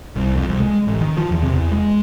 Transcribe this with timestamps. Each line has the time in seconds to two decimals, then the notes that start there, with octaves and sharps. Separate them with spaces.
0.16 C2
0.36 F2
0.49 C2
0.60 G#3
0.87 A1
1.01 D#3
1.17 F3
1.31 E2
1.42 C3
1.54 E2
1.72 G#3